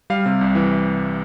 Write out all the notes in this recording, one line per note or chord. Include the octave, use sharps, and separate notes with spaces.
G3 F5
C3
C2
E3